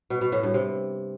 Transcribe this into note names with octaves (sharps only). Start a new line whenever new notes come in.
B2
B2
A2
G2
C3